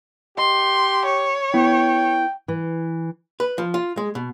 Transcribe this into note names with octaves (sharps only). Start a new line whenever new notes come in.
G4 D#5 C6
C#5
B3 E4 G5
E3
B4
F3
F4
G#3
B2